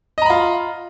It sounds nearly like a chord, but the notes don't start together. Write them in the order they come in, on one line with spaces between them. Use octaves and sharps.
D#5 A#5 B5 F4